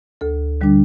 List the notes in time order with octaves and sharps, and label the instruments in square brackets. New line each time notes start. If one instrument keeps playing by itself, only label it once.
[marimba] D2 A4
D3 G3 D4